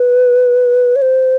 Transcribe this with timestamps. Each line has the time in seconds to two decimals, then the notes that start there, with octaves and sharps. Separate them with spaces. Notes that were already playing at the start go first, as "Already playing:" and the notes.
Already playing: B4
0.96 C#5
1.02 C5